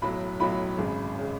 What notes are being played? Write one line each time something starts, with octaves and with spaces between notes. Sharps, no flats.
B1 A2 F#3 B5
B1 A2 F#3 B5
G#1 F#2 C#3 G#3
C#3 G#3